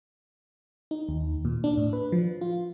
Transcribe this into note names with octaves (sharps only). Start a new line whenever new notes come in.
D#4
D#2
A#2
D4
A2
B4
F3
F4